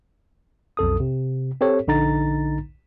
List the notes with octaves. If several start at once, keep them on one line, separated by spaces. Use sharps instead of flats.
B1 F2 A4 D#6
C3
C4 G4 A4 C#5
A#1 D3 D#4 A#5 A6